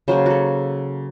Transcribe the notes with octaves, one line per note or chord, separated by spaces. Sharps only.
C#3 F#3 A#3 C5
F#4 A4